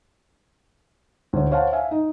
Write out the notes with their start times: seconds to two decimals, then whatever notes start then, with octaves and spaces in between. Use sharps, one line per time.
1.33 D2 C#5
1.51 C5 C#5 F5 F#5 A5
1.73 E5 F5 G#5
1.91 D#4